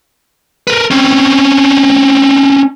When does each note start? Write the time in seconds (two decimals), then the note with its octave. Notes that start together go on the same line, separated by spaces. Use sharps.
0.67 A#4 B4
0.91 C4 C#4